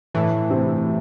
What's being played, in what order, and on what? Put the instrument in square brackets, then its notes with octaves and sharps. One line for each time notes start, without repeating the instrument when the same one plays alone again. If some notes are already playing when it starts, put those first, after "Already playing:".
[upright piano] A2 A3 [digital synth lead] E3
[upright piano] C3 C4